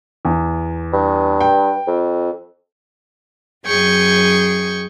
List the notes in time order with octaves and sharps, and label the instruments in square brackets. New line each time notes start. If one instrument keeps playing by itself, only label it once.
[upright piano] E2
[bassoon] G2
[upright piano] G5
[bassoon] F2
[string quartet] F#2 G#4 G5 C#6 G#6